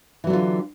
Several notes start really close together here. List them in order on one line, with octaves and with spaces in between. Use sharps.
E3 F#3 D3 F4